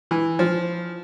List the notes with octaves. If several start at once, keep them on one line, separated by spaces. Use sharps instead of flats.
E3
F3